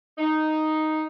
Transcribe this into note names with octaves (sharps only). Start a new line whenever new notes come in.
D#4